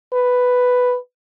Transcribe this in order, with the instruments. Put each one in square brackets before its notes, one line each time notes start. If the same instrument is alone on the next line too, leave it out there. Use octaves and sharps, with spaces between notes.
[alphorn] B4